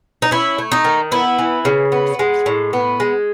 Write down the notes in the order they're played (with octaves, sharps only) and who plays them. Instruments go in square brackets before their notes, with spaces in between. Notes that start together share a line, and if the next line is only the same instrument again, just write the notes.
[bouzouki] D#4
C#4 E4
A3
D#4
D#3
B3 E4
E3
C#3
B3
G#3
A2
B3
G#3